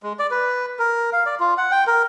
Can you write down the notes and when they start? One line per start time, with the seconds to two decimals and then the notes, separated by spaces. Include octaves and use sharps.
0.03 G#3
0.19 D5
0.31 B4
0.79 A#4
1.13 F5
1.26 D5
1.40 F4
1.58 F#5
1.71 G5
1.87 A#4